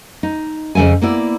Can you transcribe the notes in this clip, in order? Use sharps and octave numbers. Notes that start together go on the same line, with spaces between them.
D#4
F2 C#3 C4 E5 G#5
A#3 B3 E4 D5